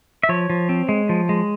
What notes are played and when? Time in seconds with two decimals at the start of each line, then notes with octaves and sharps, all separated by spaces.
0.23 E5
0.29 F3 C#5
0.50 F3
0.69 C4
0.89 G#3
1.09 F3
1.29 G#3